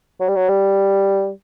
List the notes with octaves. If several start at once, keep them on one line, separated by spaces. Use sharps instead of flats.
F#3
G3
F#3
G3